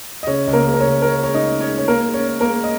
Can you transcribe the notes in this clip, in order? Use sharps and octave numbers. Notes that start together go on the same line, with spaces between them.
D#5
C#3 C#4 C#5
C#2
A#3 A#4
G#3
A#4
C#4 C#5
C#2
A#4
C#4 C#5
G#3 C#5
D#4 D#5
C#4
C#4 C#5
G#3
C#5
G#3 A#3 A#4
G#3
C#4 C#5
C#4
A#3 A#4
G#3
D#5